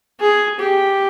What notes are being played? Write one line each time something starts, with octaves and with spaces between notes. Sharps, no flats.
G#4
G4